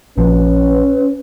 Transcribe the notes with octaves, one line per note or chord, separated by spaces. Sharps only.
A#1 A#2 F3 C#4 B4